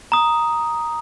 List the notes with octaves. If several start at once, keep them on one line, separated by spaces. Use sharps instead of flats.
A#5 D#6